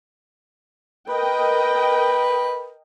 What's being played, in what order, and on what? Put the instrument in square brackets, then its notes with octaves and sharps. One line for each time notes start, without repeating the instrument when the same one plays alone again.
[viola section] A#4 D#5 G5 [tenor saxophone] B4